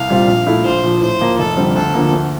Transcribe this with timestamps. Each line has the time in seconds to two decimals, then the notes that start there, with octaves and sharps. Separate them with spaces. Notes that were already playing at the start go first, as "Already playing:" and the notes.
Already playing: C2 F5
0.09 A#2 G3 C4 F4
0.27 A#1
0.46 A#2 A3 E4
0.65 A#1 C5
0.83 A#2 F3
1.02 A2 C5
1.20 F3 A#3
1.39 F1 A4
1.57 F2 D3 G3 C4
1.75 D2 A4
1.94 D3 F3 A#3
2.12 D2